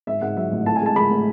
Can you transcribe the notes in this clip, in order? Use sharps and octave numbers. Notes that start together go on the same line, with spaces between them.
G#2 E5
G#2 F#5
F#3 E5
A1
A2 A5
G#5
G#3 A5
G#3 B5
A2